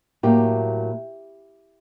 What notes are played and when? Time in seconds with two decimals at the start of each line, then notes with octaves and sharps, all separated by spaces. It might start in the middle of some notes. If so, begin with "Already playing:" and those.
0.23 A2 F#3 A#3 G4